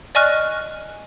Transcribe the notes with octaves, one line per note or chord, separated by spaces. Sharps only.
D5 D#5 G#5 C#6 F6 F#6